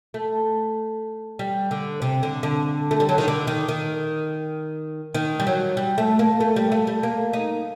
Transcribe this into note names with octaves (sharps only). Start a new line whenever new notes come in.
A3
G3
D3
C3
D3
D3
A3
G3
F#3
D#3
D3
D#3
D#3
D#3
G3
F#3
G3
A3
A#3
A3
G3
A3
G3
A#3
D#4